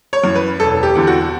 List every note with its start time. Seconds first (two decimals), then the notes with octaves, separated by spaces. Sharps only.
0.13 C#5
0.24 F#2 E3
0.35 B4
0.60 E1 A4
0.83 G4
0.95 E2 D3
1.07 F#4